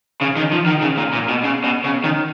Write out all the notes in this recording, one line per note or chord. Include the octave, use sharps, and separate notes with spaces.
C#3
D#3
F3
D#3
C#3
A#2
A#2
B2
C#3
B2
C#3
D#3